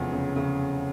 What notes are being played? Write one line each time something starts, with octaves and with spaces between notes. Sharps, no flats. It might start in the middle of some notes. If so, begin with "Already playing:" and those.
Already playing: F1 E2 C#3 F3
C#3
C#3